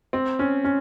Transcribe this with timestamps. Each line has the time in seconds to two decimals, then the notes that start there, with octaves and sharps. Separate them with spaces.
0.13 C4
0.39 C#4
0.64 C#4